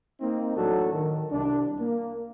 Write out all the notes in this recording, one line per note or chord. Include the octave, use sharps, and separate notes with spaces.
A#3 C4 D#4
A1 A2 F#3 D4 F#4 A4
D#3
C2 D4
A#3